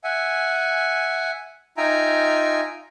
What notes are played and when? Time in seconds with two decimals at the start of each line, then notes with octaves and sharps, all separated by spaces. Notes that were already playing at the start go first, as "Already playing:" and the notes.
0.04 E5 F#5 G#5
1.77 D#4 F4 E5 G5 G#5 A#5